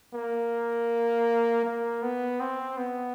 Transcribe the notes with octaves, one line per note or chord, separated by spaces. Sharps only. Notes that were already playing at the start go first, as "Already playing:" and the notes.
A#3
A#3
B3
C4
B3